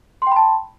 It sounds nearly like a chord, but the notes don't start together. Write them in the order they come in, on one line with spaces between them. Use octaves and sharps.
C6 G5 B5 A5